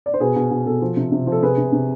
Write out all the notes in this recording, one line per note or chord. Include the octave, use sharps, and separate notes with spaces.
D5
C5
B2 G#4 B4
B2
B2
B2 A4
F3
C3
C3
F3
A4
C3 G#4 B4
C3
C3